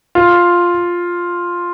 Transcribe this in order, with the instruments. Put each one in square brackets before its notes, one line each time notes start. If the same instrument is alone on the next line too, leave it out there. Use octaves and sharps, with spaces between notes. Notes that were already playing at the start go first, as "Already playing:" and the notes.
[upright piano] F4